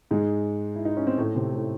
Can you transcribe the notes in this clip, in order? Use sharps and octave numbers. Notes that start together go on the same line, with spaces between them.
G#2 G#3
E4
D#4
C#4
C4
A2 A3
C3 C4
A2 A3